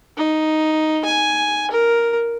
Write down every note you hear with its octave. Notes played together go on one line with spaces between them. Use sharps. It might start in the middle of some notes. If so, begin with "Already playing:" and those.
D#4
G#5
A#4